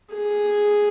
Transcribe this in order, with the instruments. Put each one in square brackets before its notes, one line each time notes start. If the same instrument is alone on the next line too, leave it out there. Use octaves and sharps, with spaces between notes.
[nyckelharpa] G#4